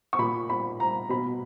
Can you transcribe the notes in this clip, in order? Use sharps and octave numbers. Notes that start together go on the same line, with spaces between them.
C#6
A#2 B5
B5
A#5
B2 B5